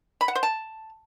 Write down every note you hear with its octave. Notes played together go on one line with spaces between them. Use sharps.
B5
F#5
C5
A5